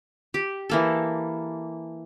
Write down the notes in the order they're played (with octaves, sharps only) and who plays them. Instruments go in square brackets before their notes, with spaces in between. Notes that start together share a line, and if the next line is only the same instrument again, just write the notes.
[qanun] G4
E3 A#3 A4